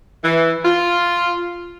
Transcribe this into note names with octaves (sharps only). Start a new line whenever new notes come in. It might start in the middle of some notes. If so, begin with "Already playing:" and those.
E3
F4